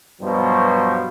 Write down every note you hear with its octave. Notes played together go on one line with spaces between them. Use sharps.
G2 B2 F3 F#3